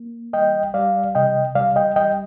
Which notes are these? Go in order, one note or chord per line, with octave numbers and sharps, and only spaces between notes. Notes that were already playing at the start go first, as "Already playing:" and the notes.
Already playing: A#3
G3 D#5 G5
G3 D5 F5
C3 D#5 G5
G3 D5 F5
D#5 G5
G3 D#5 G5